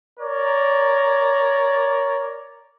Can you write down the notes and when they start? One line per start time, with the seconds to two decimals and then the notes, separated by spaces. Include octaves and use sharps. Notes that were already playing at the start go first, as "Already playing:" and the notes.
0.20 A#4 C#5 D5